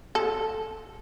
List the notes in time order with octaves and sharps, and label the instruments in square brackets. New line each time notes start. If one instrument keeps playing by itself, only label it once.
[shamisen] A4